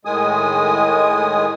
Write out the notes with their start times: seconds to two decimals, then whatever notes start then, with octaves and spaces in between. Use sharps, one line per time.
0.05 A2 D#3 G#3 G#5 D#6